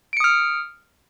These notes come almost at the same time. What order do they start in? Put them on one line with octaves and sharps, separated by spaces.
D7 C#7 D#6 F6